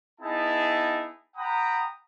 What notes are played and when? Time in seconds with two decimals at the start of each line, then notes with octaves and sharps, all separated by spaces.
0.21 B3 D#4 E4 G#4 E5 A5
1.36 F#5 G5 A#5 B5 D#6